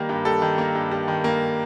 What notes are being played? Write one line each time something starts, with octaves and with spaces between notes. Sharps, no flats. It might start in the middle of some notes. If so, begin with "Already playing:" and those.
Already playing: D#3 G3 A#3
G2
G3 A4
D#3
A#3
G2
G3
D#3
A#3